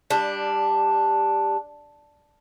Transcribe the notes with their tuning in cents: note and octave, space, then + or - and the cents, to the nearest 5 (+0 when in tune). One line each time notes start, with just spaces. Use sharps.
G3 +15 D4 +0